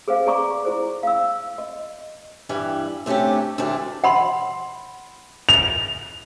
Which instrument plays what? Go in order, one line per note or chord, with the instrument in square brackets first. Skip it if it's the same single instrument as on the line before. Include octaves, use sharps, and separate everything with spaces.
[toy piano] G#4 B4 C5 F5
G#4 D5 A#5 C#6 D6
E4 G#4 C5
F5 E6
D#5
[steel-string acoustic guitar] G2 E3 G3
C3 A3 C#4 D4 G4
D2 G#2 E3 A3 D4 G4
[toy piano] F#5 B5 C6
[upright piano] F7